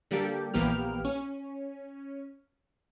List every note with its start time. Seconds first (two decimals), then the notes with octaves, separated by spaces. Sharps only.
0.11 D3 G3 A#3 G4 A4
0.54 A#1 E3 A#3 B3 G4 F6
1.05 C#4